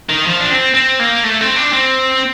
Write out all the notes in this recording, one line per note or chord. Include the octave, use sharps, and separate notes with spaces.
D#3
F3
D4
C4
C4
A#3
A3
C4
D4
C4